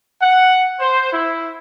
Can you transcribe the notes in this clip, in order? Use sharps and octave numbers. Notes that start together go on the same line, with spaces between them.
F#5
C5
E4